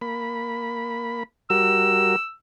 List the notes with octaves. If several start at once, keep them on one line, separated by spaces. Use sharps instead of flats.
A#3 B5
G3 F#4 A#4 E6